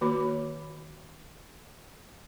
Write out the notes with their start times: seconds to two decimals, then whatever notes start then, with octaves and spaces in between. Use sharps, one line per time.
0.01 D#3 A#3 F#4 C#5 B5